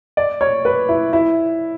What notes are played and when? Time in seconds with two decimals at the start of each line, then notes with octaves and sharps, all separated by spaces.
0.17 D5
0.41 C#5
0.65 B4
0.89 E4
1.13 E4